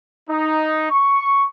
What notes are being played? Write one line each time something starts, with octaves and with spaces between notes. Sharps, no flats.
D#4
C#6